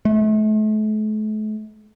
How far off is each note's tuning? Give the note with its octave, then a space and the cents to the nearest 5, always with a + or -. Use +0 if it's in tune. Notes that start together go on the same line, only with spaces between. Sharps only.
A3 -40